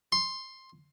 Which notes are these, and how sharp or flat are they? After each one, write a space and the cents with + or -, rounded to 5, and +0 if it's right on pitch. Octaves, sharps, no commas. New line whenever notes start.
C6 +10